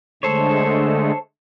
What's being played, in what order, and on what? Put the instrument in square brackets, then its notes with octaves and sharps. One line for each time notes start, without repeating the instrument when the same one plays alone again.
[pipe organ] D3 G#3 A3 [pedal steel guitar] A4 C5 C#5